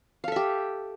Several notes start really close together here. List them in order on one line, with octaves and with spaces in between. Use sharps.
F5 A4 E5 G4